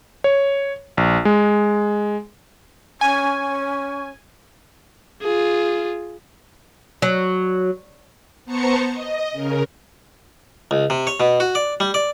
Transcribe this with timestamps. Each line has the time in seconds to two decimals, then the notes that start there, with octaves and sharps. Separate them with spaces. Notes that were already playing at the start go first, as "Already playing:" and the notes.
0.24 C#5
0.97 A#1
1.25 G#3
3.01 C#4 G#5
5.23 F4 G#4
7.02 F#3
8.45 B3 C5 A5 A#5 C#6 C#7
8.92 D#5
9.32 C#3 A#4
10.71 C#2
10.90 C3
11.07 C#5
11.20 B2
11.40 F#4
11.55 D5
11.80 G3
11.94 D5